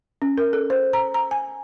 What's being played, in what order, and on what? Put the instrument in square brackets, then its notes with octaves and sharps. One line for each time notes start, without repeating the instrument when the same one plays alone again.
[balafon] C#4
A#4
A4
C5
A#5
A#5
G#5